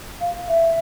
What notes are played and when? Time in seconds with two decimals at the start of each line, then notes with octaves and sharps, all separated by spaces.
0.21 F5
0.48 E5